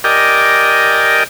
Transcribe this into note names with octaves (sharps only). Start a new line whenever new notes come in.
G4 A#4 D5 D#5 G5 G#5